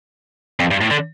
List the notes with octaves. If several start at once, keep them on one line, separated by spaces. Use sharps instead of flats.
F2
G2
A2
D3